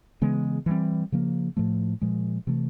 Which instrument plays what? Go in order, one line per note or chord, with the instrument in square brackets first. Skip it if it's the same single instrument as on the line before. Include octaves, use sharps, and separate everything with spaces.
[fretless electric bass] C#3 E3 G#3 B3
E3 G3 C4
C#3 F3 A#3
A2 F3 A3
A#2 F3 G#3
C3 E3 A3